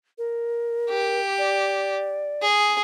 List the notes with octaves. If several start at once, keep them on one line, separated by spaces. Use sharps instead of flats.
A#4
G4
D5
G#4